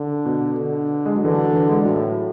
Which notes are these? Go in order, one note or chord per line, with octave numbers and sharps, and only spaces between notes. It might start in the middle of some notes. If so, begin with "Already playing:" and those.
Already playing: D3
B2
D3
G#3
F#3
D3 E3
F#3
E3
G#3
A2 F#3